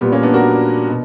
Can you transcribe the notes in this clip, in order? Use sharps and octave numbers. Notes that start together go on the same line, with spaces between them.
A#2 G3 B3
A#3 C#4
B3 D4
F#4 A#4
B2